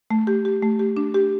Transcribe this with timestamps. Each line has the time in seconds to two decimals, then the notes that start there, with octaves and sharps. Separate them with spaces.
0.10 A3
0.27 G4
0.45 G4
0.62 A3
0.79 G4
0.97 D4
1.14 G4